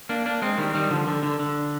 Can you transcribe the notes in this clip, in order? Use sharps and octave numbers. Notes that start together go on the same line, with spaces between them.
A#3 D4
A#3 D4
G#3 C4
D#3 G3
D#3 G3
D3 F3
D3
D3
D3